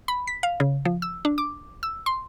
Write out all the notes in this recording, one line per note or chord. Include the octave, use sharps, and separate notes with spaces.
B5
B6
F5
C#3
F3
E6
D4
D6
E6
C6